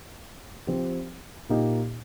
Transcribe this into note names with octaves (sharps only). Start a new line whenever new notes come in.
F3 C4 G4
A#2 A#3 D#4 G4 D#5